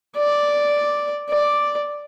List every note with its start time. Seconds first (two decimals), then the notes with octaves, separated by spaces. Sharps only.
0.17 D5
1.29 D5